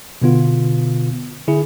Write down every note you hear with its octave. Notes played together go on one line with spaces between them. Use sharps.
B2 D3 B3 F4
D3 E4 G#4